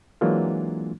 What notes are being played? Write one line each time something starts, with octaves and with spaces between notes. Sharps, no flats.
E3 F#3 G#3 A#3 D4 F4